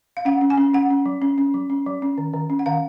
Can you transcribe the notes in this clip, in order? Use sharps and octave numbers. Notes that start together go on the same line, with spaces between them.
F5
C#4 F#5
C#4
G#5
C#4
C#4 F#5
C#4
F#3
C#4
C#4
F#3
C#4
F#3
C#4
D#3
D#3
C#4
F#5
D#3 F5